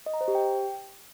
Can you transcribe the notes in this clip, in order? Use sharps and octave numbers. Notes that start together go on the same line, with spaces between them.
D#5
A#5
C5
G4
G5